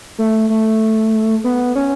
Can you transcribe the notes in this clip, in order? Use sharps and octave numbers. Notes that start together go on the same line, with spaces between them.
A3
A3
B3
C#4